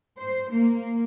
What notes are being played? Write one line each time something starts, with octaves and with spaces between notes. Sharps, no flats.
C5
A#3